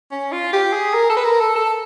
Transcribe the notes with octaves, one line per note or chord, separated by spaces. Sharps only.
C#4
F4
G4
G#4
A#4
A4
B4
A#4
A4
A4